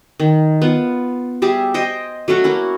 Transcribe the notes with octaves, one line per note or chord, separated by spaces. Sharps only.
D#3
B3 F4
G3 G4 G#4 E5
C5 D#5 G5 G#5
F#3 A3 C#4 F#4
A#3 C#4 E4